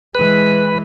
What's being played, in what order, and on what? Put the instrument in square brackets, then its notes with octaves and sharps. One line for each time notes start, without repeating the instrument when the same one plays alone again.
[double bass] E3 G#3 [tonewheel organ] B4